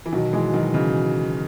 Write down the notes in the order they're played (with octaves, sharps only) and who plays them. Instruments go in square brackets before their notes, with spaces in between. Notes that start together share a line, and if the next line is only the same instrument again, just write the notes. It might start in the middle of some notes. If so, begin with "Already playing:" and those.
[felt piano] E3
[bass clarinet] B2 [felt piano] D#3 F#3
[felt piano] E3 G#3
D#3 F#3
C#3 E3